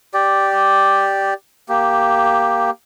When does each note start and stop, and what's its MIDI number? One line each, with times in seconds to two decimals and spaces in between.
0.14 1.34 67
0.14 1.34 74
1.69 2.70 58
1.69 2.70 67